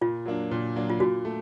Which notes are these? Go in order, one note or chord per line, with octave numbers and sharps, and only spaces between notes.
A#2 F4
F#3 A#3 D4
A#2
F#3 A#3 D4
F4
A#2 F#4
A3